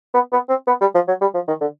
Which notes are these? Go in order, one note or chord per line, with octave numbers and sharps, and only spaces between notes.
B3
B3
C4
B3
G3
F3
F#3
G3
F3
D#3
D3